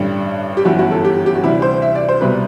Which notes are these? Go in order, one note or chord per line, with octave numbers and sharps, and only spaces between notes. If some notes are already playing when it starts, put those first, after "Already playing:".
Already playing: A1 G2 D3 G3
G4
G1 F#2 E3 F#4
F#4
A4
G4
G4
F#4
D2 C3 E3 G3 E4
C5
E5
D5
C5
C2 B2 G3 B4